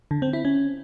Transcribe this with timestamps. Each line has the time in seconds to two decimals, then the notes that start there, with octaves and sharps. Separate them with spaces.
0.11 D3
0.22 C4
0.33 E4
0.45 C#4